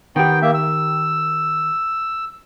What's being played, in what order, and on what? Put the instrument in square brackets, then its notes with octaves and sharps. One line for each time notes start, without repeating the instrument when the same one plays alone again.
[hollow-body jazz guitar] D#3 G4 [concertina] B3 G5
[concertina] A#3 E5
E6